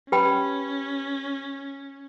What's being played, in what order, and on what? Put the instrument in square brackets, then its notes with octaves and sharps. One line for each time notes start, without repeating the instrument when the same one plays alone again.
[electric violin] C#4 [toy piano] G4 B4 G5 B5